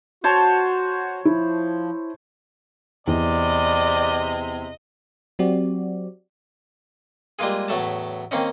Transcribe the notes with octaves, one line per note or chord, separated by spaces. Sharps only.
F#4 C5 C#5 A5
F3 E4
E2 C3 D5 D#5
F#3 C4 F#4 G4 D5
G3 G#3 A#3 F4 G#4
E2 A2 F#3 A3 A5
D#3 A#3 C4 C#4 D#4